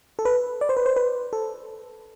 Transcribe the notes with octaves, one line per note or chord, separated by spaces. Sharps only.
A4
B4
D5
C5
B4
C5
B4
A4